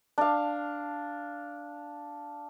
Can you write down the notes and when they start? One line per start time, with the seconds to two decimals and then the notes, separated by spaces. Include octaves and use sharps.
0.18 D4 F5